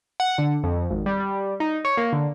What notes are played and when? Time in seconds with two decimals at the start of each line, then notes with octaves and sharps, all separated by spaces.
0.20 F#5
0.38 D3
0.64 F2
0.90 G#1
1.06 G3
1.20 G3
1.60 D#4
1.85 C#5
1.97 A#3
2.13 D3